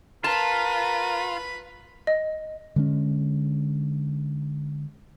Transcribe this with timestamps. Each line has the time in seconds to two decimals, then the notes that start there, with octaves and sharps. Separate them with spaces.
0.24 F4 A#4 B4 A5 B5
2.07 D#5
2.76 D3 G#3 A3 C#4